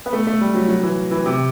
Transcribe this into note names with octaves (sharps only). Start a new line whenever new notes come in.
B3
A3
A3
G3
F#3
F#3
E3
E3
C3